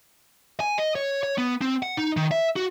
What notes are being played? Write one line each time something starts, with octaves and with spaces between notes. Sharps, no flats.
G#5
D#5
C#5
C#5
B3
C4
F#5
D#4
D#3
E5
F#4